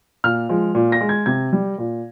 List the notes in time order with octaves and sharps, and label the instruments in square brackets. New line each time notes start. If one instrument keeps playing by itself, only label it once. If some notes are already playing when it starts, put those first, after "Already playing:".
[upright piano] A#2 F6
F3 G#3
A#2
A#6
G#3
G#6
C3 G#6
G3
A#2